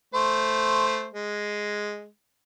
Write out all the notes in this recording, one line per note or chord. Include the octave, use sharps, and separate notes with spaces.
A3 C5
G#3